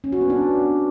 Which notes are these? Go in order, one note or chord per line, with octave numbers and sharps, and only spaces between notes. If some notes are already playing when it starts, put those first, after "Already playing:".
C#4
F#4
B3
D4